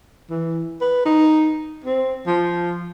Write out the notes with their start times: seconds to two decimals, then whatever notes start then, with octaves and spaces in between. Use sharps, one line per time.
0.30 E3
0.81 B4
1.05 D#4
1.84 C4
2.27 F3